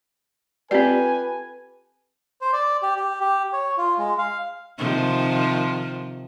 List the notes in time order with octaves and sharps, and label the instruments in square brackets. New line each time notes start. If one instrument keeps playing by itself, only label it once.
[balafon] C4 D5 [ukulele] F4 G4 A4 [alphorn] B4 [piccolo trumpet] G#5
[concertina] C5
D5
G4
G4
G4
C#5
F4
G#3
F5
[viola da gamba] C3 D#3 F3